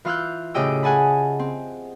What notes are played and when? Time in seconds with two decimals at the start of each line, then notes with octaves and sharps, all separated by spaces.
0.05 E3 F4 F5 E6 F#6 G6
0.54 A2 C#3 G4 D#5 G5 E6
0.83 G#4 F#5 G#5 A5 B5
1.39 C4